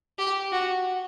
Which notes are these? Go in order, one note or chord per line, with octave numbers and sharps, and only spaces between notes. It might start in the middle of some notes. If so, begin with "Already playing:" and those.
G4
F#4